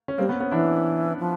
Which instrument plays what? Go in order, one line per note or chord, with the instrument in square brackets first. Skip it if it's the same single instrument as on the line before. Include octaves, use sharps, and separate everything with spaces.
[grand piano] C#4
[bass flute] G3 [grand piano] A#3 C4
[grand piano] B3 C#4
B3 C#4
[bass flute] E3 [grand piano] D4 E4
[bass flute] F3